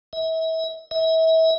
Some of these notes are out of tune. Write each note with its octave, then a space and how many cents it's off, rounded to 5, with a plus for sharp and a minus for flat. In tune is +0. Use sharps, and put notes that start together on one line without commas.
E5 -35
E5 -35